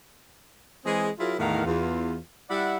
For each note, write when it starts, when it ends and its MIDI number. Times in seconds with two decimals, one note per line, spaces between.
0.85 1.09 52
0.85 1.09 56
0.85 1.09 60
0.85 1.09 68
1.19 1.34 54
1.19 1.34 64
1.19 1.34 65
1.19 1.34 68
1.19 1.34 70
1.39 1.65 40
1.39 1.65 45
1.39 1.65 51
1.39 1.65 70
1.39 1.65 77
1.39 1.65 78
1.65 2.18 40
1.65 2.18 65
2.50 2.77 55
2.50 2.77 64
2.50 2.77 74
2.50 2.77 76
2.50 2.77 78